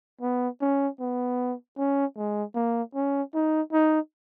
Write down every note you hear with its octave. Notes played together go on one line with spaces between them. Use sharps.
B3
C#4
B3
C#4
G#3
A#3
C#4
D#4
D#4